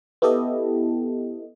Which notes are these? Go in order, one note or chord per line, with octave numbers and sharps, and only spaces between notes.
B3 E4 G4 A4 D#5